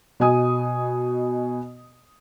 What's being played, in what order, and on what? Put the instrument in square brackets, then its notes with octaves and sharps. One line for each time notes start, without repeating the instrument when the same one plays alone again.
[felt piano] B2 D#5 G#5 D#6